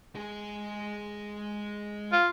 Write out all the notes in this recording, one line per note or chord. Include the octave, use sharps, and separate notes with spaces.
G#3 G#4
F4